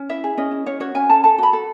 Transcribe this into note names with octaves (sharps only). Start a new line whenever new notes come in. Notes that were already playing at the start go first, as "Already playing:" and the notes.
Already playing: C#4
E4 E5
G#4
C#4 D#5
E4
C#4 C#5
F#4 C#5
C#4 G#5
A4 A5
A4 A5
F#4 B5
A4